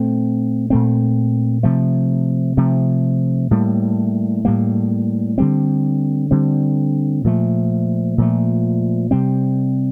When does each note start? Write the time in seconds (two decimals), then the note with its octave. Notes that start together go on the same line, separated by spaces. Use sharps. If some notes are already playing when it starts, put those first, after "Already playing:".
Already playing: A#2 A3 C4
0.70 A#2 A3 C4
1.63 C3 F3 A3
2.57 C3 F3 A3
3.51 A2 G3 A#3
4.45 A2 G3 A#3
5.38 D3 G3 C4
6.31 D3 G3 C4
7.24 A#2 F3 A3
8.18 A#2 F3 A3
9.11 C3 G3 C4